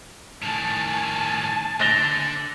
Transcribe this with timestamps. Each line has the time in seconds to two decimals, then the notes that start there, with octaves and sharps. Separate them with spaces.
0.42 A2 D#3 G#5 A5
1.80 D3 A6 A#6 G7